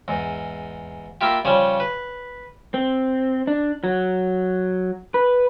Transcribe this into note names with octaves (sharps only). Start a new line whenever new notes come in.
E2 G#2
A#3 E4 F4 G4
C#3 F3 G3 C#4
B4
C4
D4
F#3
B4